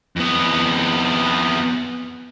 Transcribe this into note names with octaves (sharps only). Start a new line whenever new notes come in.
F2 B3